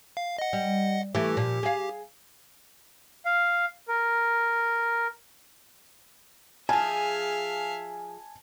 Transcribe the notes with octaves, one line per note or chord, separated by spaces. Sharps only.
F5
D#5 F#5
G3
E3 A3 G4
A#2 F3
G#4 F5
F5
A#4
F3 G#4 E5 F5 G#5 A5